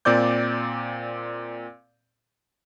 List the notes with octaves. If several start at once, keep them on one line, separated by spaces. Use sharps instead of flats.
A#2 C4 D5 D6 G6